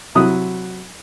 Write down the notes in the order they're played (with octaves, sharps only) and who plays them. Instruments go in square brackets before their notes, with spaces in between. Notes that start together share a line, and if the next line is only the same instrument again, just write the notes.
[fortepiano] C3 F#3 E4 D#6 F#6